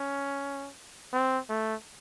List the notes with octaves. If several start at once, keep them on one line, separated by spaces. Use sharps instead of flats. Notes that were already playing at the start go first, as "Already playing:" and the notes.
Already playing: C#4
C4
A3